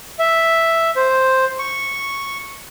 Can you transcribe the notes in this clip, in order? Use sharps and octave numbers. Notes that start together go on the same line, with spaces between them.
E5
C5
C#6